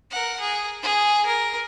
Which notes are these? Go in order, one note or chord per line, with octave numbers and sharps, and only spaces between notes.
A#4 F#5
G#4
G#4
A#4